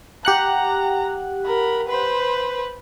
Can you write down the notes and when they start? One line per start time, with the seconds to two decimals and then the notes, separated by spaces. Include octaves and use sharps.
0.25 G4 F#5 A#5 F#6
1.45 A#4 B5
1.88 B4 C5